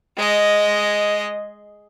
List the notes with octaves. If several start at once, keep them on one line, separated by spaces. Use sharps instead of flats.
G#3 D#5